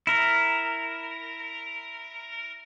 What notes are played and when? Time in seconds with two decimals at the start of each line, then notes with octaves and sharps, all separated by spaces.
0.07 E4 A#4